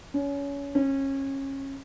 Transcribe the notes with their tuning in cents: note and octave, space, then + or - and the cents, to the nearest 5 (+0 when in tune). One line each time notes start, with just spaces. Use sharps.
C#4 +25
C#4 -25